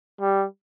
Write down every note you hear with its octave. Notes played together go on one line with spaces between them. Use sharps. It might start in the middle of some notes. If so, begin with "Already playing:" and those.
G3